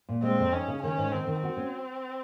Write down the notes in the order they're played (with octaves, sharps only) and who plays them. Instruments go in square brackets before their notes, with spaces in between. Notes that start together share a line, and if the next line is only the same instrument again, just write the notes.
[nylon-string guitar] A#2
[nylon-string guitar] G#3 [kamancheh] C4
[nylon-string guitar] F2
[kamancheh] C#4 [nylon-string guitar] D#4
[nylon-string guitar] C#3
[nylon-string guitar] D#3 [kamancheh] C#4
[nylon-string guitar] G#2
[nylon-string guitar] D#3 [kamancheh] C4
[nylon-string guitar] D#3
[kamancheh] C4 [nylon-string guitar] F#4
[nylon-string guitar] C#4